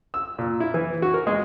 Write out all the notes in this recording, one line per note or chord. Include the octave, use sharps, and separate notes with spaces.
E6
A#2
E4
E3
F#4
A#4
G#3